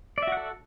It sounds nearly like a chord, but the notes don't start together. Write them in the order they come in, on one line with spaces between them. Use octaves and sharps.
D5 E5 F#4 F#5 A4